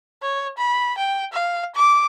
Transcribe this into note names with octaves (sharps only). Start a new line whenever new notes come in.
C#5
B5
G5
F5
D6